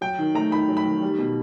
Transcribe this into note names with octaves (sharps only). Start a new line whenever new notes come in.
F#3 G5
D#3
A3 A#5
D#3 B5
F#3
B5
D#3
G3
B2